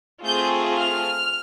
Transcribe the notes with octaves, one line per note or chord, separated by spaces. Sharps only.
A3 C4 F4 G#4 G6
F6